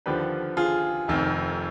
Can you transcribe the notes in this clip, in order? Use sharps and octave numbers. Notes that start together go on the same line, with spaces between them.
D#2 D3 F3 G4 B4
F4 G#4
F1 F2 D#3